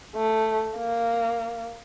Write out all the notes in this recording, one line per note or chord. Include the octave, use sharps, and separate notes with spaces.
A3
A#3